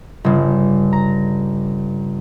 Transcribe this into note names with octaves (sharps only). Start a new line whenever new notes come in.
G1 C#3
A#5